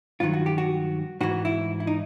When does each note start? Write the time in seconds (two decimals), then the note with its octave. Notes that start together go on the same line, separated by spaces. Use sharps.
0.20 G2 D#3 F#3 F4
0.33 F#4
0.46 G4
0.58 F#4
1.21 G#2 E3 F#4
1.45 E4
1.80 E4
1.87 D#4